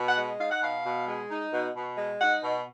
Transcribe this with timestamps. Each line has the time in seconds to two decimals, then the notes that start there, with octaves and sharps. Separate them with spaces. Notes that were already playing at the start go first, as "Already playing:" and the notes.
Already playing: B2
0.09 F#5
0.16 G#3
0.39 D#4 F5
0.51 F#5
0.62 B2 F5
0.84 B2
1.07 G#3
1.30 D#4
1.52 B2
1.75 B2
1.98 G#3
2.21 D#4 F#5
2.43 B2